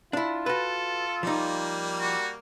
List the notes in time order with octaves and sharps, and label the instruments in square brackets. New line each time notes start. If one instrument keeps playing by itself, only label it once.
[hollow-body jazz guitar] D4 E4 [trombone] F4
[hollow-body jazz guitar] F#4 B4 [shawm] A4
[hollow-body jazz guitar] F3 D#4 [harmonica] G3 A#3
[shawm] F#4